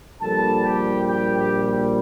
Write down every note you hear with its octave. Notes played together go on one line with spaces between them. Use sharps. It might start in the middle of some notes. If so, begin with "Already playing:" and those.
A#1 A#2 G3 A4 A5
G4 G5
G4 G5
G4 G5
G4 G5